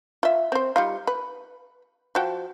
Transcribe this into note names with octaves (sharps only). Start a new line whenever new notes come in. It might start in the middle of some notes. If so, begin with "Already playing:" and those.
F4 E5
C4 C5
G3 D#4 F4
B4
F3 F#4 G5